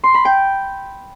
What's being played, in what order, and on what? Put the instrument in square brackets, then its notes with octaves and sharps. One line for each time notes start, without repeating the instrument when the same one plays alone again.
[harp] C6
B5
G5